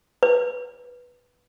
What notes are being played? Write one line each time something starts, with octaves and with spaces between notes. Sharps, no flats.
B4